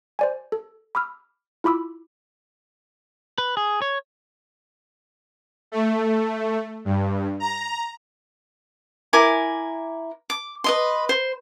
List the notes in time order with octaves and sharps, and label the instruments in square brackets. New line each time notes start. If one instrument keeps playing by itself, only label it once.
[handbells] C5 D5 G#5
A4
B5 D6 E6 F6
E4 F4 B5 D6 E6
[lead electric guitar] B4
G#4
C#5
[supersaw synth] A3
G2
A#5
[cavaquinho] E4 A#4 G#5 D6
D6
B4 D#5 C6
C5